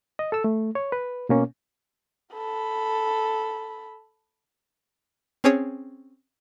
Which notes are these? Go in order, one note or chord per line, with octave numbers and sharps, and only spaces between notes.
D#5
A4 E6
A3
C#5
B4
B2 A#3 C#4
A4 B5
C4 C#4 G#4 C#5